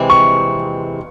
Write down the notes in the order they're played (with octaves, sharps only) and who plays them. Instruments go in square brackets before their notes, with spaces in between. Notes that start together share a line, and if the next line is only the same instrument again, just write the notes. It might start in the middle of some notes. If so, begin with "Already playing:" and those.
Already playing: [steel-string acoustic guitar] C3 E3 G#3 C4
[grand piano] C#6